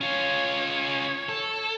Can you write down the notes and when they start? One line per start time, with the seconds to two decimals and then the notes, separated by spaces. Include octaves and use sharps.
0.01 C#4 F4 C#5
1.29 A4